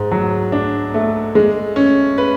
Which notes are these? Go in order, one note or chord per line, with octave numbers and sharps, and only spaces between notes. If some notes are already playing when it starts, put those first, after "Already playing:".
Already playing: G#2
F#3
D4
A3
G#3
C#4
B4